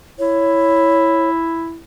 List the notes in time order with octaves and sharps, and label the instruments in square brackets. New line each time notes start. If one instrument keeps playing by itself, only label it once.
[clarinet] E4 [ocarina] C#5